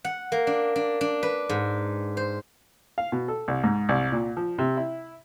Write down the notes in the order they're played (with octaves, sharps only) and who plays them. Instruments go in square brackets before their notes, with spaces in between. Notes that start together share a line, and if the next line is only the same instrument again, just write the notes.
[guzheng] F#5
A#3
D4
D4
D4
B4
G#2
C5
[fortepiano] F5
B2
A4
C2
G#2
C2
A#2
F3
C3
E4